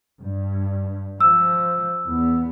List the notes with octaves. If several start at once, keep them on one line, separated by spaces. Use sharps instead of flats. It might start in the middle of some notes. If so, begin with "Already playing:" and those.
G2
F3 E6
E2 B3